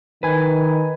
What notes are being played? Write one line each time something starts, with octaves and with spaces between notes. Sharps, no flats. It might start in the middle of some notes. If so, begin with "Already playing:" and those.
D#3 B4 G#5